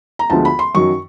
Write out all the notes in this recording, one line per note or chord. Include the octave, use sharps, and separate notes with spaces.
A#5
D2 D3 F3 G#3 B3 A5
B5
C6
F#2 D#3 F#3 C#6